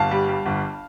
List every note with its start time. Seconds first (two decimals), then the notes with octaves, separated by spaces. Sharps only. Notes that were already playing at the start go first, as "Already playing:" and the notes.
Already playing: G1 F5 A5
0.11 G3
0.29 G3
0.46 G1